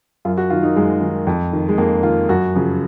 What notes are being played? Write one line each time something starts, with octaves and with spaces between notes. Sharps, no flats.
F#2 F4
F#4
D#3 F4
D#4
F#2 G#3
D#3
F2
D#3
G#3
F2 A#3
D#3 F4
F#2 F#4
C#3 F3